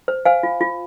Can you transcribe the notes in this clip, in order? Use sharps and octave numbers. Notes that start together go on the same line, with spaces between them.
C5
C5 F5 G#5
F4
F4